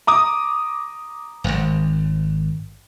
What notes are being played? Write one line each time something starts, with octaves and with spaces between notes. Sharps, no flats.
A#5 D6 D#6
D#1 G#1